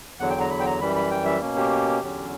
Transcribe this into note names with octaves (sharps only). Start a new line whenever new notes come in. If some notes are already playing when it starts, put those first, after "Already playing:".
E2 D3 F#3 F#5
G5
A#5
B5
G5
A#5
F#2 E3 G3 B5
B5
G5
E5
B2 A#3 C#4
G4
E2 D3 F#3 C#4